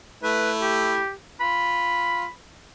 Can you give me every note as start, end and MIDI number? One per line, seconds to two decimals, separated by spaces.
0.23 1.01 57
0.23 1.01 64
0.23 0.51 71
0.62 1.13 67
1.41 2.25 65
1.41 2.31 83